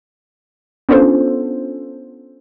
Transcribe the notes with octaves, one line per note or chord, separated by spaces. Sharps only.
B3 C#4 D4 F4 A4 C5